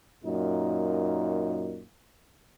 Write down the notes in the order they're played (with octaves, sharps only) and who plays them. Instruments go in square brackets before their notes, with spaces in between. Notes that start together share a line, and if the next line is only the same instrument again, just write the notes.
[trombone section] F#2 A#2 D#4